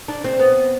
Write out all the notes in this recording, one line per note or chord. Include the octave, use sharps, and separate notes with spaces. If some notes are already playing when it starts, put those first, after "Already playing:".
D4
C4
B3